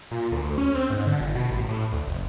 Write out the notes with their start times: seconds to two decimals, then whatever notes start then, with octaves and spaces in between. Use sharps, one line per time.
0.11 A#2
0.32 D2
0.58 C#4
0.75 C4
0.90 G#2
1.07 D3
1.21 G1
1.35 B2
1.51 A1
1.69 A2
1.93 D2
2.08 F#1